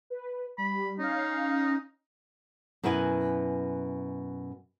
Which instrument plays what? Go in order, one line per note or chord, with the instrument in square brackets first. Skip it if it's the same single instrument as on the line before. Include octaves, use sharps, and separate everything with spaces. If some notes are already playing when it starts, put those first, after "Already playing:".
[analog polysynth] B4
[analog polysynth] G3 [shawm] B5
[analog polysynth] C#4 F5 [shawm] D#4
[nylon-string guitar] F#2 B2 E4 B4 G#5